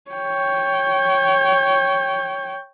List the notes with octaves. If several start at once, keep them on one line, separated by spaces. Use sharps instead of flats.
C#5 G5